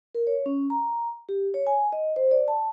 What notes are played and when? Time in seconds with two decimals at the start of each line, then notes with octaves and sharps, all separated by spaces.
0.15 A#4
0.27 C#5
0.46 C#4
0.70 A#5
1.29 G4
1.54 C#5
1.67 G#5
1.93 D#5
2.16 C5
2.31 D5
2.48 A5